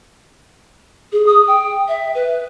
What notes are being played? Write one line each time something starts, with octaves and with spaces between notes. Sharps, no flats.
G#4
D#6
G5
E5
B4